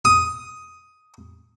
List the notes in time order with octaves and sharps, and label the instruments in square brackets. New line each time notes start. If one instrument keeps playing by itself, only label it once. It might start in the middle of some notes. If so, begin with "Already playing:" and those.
[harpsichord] D#6